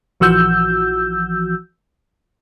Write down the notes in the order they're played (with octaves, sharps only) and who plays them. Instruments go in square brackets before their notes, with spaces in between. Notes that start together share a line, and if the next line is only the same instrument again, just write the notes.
[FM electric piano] A#1 E3 F3 F#4 E6 G6